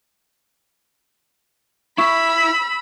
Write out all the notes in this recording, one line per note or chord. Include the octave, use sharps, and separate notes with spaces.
E4 B5 C#6 E6